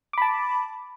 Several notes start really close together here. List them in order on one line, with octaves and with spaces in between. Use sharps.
D6 B5 A5